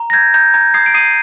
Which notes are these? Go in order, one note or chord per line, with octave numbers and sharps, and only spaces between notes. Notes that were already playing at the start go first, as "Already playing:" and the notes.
Already playing: A#5
A#6
G6 G#6
A#5 G6
A#5 G#6
D#6 G#6 C7
D7
D#6 C7 D#7